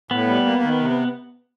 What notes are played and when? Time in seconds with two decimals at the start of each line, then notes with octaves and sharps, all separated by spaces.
0.11 A2 B3
0.28 G3
0.45 A#3
0.62 D#3
0.80 C3